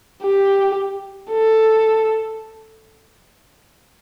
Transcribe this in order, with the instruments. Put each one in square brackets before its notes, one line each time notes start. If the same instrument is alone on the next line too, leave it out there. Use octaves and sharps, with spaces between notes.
[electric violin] G4
A4